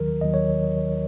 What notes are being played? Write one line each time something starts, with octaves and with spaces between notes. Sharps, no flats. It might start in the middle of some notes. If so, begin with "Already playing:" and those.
Already playing: D#2 D#3 F#3 A#4
D#2 D#3 F#3 D#5
C#5